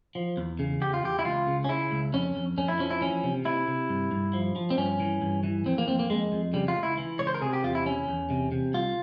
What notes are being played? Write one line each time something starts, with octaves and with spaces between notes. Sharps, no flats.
F3
E2
C#3
E2 G4
F4
E2 G4
E4
C#2 F4
C#3
C#4
C#3 E4
C#2
F2 C#4
F2
F2 C#4
E4
F3 C#4
E4
E3 C#4
C3
C3 E4
C3
G2
G2
F3
F3
C4
G2 C#4
E3
G2
E3
F2 C4
A#3
F2 C4
A#3
F2 G#3
F2
C#3 G3
F4
C#2
E4
E3
C#2 C#5
C5
A#4
C3 G#4
G4
E2 F4
E4
E2 C#4
E2
C3
C3
C2 F4